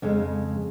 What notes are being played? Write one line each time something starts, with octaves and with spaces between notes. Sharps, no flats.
F2 C#3 G#3